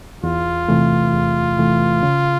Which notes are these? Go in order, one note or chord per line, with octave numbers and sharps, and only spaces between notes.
E2 F4
C3 E3 A3
E2
C3 E3 A3
C#3